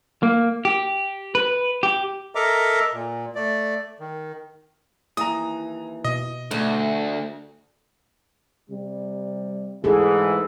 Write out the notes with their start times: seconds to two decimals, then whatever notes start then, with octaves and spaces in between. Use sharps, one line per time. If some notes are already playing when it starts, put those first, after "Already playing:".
0.23 A#3
0.65 G4
1.35 B4
1.83 G4
2.35 A4 A#4 D#5 E5 A#5 D6
2.93 A#2
3.35 A3 D5
4.00 D#3
5.17 D#2 E3 A#5 D#6
6.05 B2 D#5
6.51 D2 A3
8.70 C3 G3
9.84 G#2 E3 G#4 A4